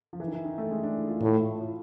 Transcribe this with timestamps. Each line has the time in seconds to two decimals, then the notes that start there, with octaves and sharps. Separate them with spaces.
0.13 F3
0.20 E3
0.27 D#3
0.33 E3
0.45 D#3
0.58 A3
0.71 G#3
0.83 D4
0.96 E4
1.09 F4
1.21 A2
1.61 F4